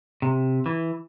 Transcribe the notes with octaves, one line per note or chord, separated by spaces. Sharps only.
C3
E3